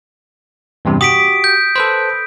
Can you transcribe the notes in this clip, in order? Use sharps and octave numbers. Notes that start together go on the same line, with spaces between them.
E2 G2 C3
F#4 G4 D#6 B6 D7
G6
A4 B4 C5